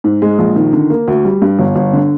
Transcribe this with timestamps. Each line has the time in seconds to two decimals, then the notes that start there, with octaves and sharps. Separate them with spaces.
0.04 G#2
0.22 G#3
0.39 A#1
0.56 D#3
0.73 D3
0.90 A#3
1.08 D2
1.25 G3
1.42 G2
1.59 G1
1.76 G1
1.93 D3